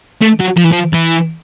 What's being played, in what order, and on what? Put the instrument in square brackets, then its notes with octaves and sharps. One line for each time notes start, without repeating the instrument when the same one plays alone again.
[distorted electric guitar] A3
F#3
F3
E3
F3
E3